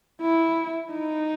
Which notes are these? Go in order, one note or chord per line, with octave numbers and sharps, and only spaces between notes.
E4
D#4